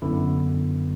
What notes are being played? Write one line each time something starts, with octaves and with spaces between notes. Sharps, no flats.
F#2 D3 B3 E4